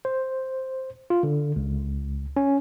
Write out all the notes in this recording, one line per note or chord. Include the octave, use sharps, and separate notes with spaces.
C5
F4
D3
C#2
C#4